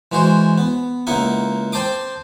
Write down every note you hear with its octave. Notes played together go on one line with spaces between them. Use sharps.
E3 G#3 F#4 G#4 C5
B3
C#2 A#3 D#4 E4 D#5 F#5
C4 C5 A5 C6 D6 D#6